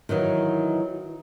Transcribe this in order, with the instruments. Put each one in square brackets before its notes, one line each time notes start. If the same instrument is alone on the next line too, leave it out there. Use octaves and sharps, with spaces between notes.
[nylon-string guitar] D#3 E3 F#3 D#4